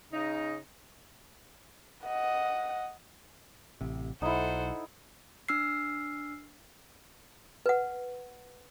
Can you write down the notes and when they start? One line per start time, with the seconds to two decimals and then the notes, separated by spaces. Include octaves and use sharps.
0.13 C#3 D#4
2.05 D#5 F#5
3.81 A1 C3
4.22 B1 D#4 E4 A4 C5 F#5
5.49 D4 E6 F6 C7
7.66 B4 F#5